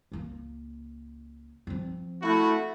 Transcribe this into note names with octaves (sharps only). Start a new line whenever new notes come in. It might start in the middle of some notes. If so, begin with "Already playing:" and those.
C#2 A#3
F3 C4
A3 E4 F#4